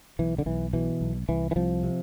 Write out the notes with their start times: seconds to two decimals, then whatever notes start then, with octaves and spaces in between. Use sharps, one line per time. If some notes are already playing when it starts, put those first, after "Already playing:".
0.19 B1 E3
0.38 D3
0.46 B1 E3
0.73 B2 E3
1.01 B1
1.29 C2 E3
1.51 E3
1.56 C2 F3
1.83 C3